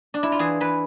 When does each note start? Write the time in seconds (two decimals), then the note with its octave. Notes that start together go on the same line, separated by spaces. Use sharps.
0.14 D4
0.23 E4
0.32 F4
0.39 E3 G#4
0.60 E3 B4